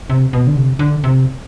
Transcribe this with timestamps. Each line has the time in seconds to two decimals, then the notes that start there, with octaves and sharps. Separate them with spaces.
0.10 C3
0.33 B2
0.47 D3
0.56 C3
0.79 D3
1.04 C3